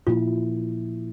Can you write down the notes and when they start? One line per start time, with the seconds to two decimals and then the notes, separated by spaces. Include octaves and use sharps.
0.07 A#2 F3 A#3 E4 F4